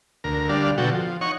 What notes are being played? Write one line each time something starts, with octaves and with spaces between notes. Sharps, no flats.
D2 A#4
D3 G3 D4 F5
B2 D3 F#3 F#4 A4 G5
F3
D#4 C#5 F#5 C#6